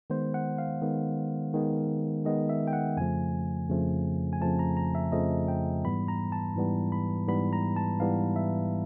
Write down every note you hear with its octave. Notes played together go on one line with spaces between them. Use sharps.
D#3 G#3 B3 C5
F#5
F5
D#3 G#3 B3
D#3 G#3 B3
D#3 G#3 B3 D#5
E5
G5
F#5
F2 C#3 F3 A3 G#5
F2 C#3 F3 A3
G#5
F2 C#3 F3 A3 A5
A#5
A#5
E5
F2 C#3 F3 A3 D#5
G5
G#2 E3 G3 B3 B5
A#5
A5
G#2 E3 G3 B3
B5
G#2 E3 G3 B3 B5
A#5
A5
G#2 E3 G3 B3 F5
E5